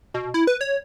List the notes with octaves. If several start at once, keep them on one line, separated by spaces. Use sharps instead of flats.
B2
E4
B4
C#5